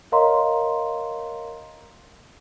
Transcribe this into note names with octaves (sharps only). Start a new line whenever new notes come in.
A#4 C#5 D#5 F5 A#5 C6